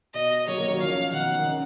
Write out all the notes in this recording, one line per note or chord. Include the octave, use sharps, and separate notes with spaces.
B2 D#5
F#3 A#3 C#5
F#3 A#3
D#3 F#3
C#3 F3 F5
B2 D#3 F#5
D#3
C#3